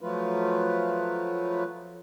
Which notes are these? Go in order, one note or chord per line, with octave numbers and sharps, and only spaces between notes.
F3 F#3 A3 F4 B4